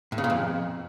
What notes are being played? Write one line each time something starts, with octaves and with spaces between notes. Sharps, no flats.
A2
C#3
A#2
F2